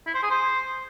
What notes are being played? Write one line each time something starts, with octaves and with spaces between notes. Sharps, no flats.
E4
C5
G#4
C5